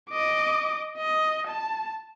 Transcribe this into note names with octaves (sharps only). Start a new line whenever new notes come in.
D#5 D6
D#5
A5